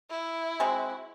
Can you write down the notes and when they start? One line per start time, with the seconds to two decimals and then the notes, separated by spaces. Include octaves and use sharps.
0.10 E4
0.60 G#3 C4 F#4